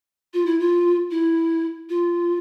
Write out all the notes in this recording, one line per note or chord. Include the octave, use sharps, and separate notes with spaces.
F4
E4
F4
E4
F4